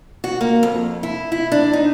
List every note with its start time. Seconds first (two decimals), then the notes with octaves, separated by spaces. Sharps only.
0.24 F#4
0.41 A#3
0.63 F2
1.03 E4
1.32 E4
1.52 D4
1.73 D#4